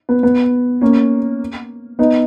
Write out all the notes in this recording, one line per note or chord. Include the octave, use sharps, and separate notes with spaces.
B3
B3
A#3 C#4
B3 D#4